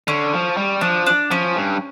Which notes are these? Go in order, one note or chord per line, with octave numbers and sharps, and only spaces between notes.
D3 C#4
F3
G3
F3 D4
D4
F3 C#4
G2